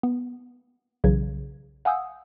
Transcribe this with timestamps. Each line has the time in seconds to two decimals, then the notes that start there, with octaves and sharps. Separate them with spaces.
0.03 B3
1.04 B1 C#3 E3 F#3 G#6
1.85 F5 F#5 G#5 D#6 E6 G6